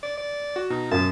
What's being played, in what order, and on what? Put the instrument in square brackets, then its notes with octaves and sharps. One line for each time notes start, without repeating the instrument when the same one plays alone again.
[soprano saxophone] D5
D5
[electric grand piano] F#4
[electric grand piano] B2 [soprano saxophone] D#4
[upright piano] F#2 [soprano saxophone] A5